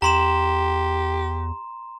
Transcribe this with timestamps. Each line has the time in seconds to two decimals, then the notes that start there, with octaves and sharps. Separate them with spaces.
0.02 E2 G4 A#5 C6 E7